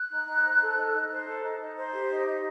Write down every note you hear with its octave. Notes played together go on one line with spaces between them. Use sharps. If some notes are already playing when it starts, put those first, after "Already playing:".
Already playing: F#6
D#4
D#4
C5
A4
D#4
D#4
C5
A4
D#4
D#4
C5
G4
D#4
D#4